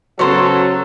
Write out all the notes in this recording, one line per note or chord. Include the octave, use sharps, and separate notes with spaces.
C#3 F#3 B3 F#4 A4 C5 C#5